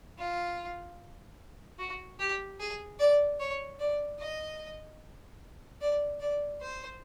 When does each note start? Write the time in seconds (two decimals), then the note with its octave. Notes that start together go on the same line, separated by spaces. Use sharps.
0.18 F4
1.79 F#4
2.19 G4
2.60 G#4
2.99 D5
3.40 C#5
3.79 D5
4.20 D#5
5.81 D5
6.20 D5
6.61 C5